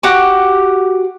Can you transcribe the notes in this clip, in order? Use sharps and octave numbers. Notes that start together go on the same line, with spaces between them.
F#4 G4 F#5